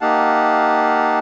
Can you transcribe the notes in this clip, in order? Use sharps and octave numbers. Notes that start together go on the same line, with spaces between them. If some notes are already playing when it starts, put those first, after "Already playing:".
A#3 D#4 G4 F5 F#5 A5